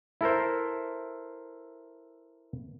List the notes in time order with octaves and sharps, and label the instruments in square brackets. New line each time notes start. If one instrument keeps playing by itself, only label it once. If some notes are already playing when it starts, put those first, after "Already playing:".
[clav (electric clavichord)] E4 A4 A#4 C5